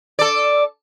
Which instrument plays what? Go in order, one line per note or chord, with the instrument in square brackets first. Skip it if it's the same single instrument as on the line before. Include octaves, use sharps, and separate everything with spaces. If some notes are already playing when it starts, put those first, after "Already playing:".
[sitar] A4 D5